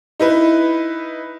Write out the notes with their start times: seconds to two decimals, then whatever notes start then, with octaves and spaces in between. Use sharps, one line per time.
0.20 D#4 E4 B4